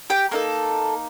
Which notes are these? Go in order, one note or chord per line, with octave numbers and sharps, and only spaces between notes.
G4 G5
A#3 D#4 A4 A#4